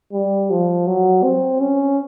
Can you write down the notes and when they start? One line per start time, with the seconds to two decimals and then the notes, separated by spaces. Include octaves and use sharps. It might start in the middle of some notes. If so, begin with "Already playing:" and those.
0.13 G3
0.50 F3
0.87 F#3
1.23 C4
1.60 C#4